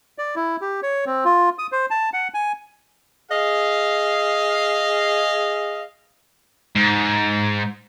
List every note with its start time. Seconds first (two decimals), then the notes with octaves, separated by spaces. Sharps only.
0.18 D5
0.36 E4
0.61 G4
0.83 C#5
1.06 C4
1.25 F4
1.59 D#6
1.72 C5
1.90 A5
2.13 F#5
2.34 G#5
3.32 G#4 D#5 F5
6.76 G#2